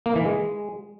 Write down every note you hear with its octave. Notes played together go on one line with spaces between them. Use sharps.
A#3
E3
G#3